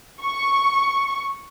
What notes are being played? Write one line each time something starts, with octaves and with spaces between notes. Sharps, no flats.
C#6